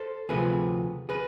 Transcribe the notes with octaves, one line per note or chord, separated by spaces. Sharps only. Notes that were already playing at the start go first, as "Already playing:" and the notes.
Already playing: A4 C5
D2 C3 F3 A3 G#4 B4
G#4 B4